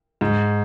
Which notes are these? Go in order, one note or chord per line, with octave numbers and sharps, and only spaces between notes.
G#2